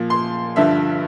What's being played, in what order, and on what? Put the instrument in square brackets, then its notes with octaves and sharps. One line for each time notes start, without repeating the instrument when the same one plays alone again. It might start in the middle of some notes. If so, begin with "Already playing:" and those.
Already playing: [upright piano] A#2 F3
C6
G2 D3 F3 E5